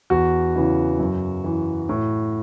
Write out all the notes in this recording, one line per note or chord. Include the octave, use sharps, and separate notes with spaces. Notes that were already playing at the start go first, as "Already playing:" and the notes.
E2 F#4
C#3 E3
F#2
E3
A2